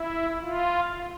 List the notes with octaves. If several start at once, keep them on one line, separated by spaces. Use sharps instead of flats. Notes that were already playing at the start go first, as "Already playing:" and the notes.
Already playing: E4
F4